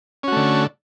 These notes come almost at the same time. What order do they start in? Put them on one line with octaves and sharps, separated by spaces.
C#4 F#4 A3 D3